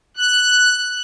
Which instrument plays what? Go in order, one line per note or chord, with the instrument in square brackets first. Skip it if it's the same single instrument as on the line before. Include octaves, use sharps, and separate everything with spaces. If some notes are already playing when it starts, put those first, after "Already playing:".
[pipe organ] F#6